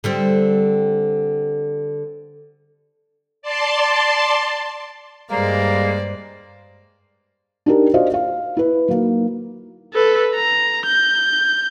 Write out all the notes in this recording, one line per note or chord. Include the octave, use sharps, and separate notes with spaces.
D3 G3 C4
D5 A5 C6
G2 G3 G#3 A#3 C5 D5
D4 D#4 G4 A#4
F4 F#4 C5 D5 D#5 F5
F5
E4 B4
F#3 A#3 D#4
A4 B4
A#5
G6